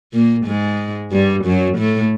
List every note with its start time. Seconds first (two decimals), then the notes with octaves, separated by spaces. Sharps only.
0.14 A#2 A#3
0.46 G#2 G#3
1.12 G2 G3
1.45 F#2 F#3
1.78 A2 A3